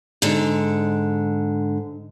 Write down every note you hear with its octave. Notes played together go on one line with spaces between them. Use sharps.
G#2 D3